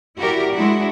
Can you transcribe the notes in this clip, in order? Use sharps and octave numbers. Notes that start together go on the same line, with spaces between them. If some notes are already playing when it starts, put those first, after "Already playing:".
E4 F#4 G4 A#4 D5
G#3 D4 E4 F#4